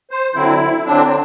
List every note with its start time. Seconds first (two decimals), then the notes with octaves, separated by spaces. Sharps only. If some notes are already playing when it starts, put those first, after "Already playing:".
0.11 C5
0.35 D3 F#3 C4 E4
0.85 D3 F#3 C4 D4